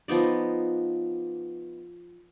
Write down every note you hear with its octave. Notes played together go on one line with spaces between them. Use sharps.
F3 B3 D#4 D5